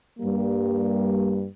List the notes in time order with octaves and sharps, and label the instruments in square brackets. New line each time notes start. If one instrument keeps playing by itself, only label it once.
[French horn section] G2 G3 A#3